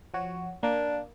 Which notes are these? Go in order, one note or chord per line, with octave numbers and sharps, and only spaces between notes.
F3 F#4 C#5
A#3 D4